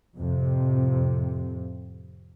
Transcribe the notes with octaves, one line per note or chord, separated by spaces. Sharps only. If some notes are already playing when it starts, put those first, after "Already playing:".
F2 A2 C3